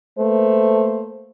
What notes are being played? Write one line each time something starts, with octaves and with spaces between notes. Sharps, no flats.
A3 A#3 B4 C5